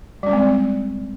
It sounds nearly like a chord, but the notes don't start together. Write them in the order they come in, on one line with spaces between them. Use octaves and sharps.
G3 C#4 G#3 C4